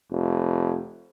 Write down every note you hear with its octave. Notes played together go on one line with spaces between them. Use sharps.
F1